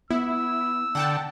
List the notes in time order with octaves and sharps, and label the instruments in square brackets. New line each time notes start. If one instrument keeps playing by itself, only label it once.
[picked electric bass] B3 [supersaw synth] E4 [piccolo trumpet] E6
[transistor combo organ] D3 [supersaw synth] F#5 G5 A5